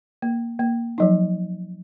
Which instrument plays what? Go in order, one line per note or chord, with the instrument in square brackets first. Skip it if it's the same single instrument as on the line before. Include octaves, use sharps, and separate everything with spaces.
[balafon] A#3
A#3
F3 F#3 D#4